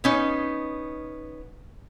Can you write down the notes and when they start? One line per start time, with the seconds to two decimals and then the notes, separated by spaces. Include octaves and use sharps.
0.04 B3 C#4 D#4